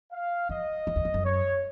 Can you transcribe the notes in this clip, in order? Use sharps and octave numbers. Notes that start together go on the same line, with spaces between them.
F5
F2 D#5
F2
E2
F2
F#2
C#5